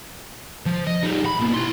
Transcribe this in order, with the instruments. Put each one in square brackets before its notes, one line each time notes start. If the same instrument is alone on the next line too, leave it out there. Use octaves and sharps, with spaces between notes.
[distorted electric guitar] F3
D#5
G3 D#4
B5
B2 A#3
E4 C6